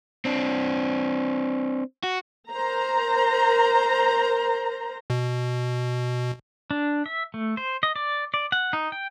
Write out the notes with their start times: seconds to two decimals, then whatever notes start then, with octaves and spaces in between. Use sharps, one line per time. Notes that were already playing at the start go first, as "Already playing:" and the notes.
0.25 C4 D4
2.03 F#4
2.51 A#4 C5 A#5
5.10 B2
6.71 D4
7.06 E5
7.34 A3
7.57 C5
7.83 D#5
7.96 D5
8.34 D5
8.52 F#5
8.73 D#4
8.92 G5